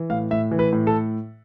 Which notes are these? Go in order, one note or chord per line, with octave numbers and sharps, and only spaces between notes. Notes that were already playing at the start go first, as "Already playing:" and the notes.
Already playing: E3
A2 F5
A2 E5
E3
B4
A2
A4